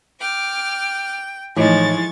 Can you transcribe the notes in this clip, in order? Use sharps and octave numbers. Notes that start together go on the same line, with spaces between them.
G5 D6 F6
A2 E3 F3 G#3 D#4 C#6 A6